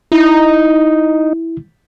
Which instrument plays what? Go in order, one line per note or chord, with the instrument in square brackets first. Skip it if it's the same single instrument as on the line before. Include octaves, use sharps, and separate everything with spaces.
[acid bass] D#4 [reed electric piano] E4